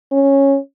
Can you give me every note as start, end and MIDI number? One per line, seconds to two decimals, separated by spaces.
0.12 0.57 61